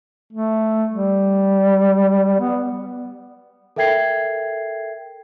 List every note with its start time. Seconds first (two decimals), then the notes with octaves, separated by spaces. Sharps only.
0.33 A3
0.93 G3
2.40 B3
3.76 A4 A#4 E5 G5 G#6 C7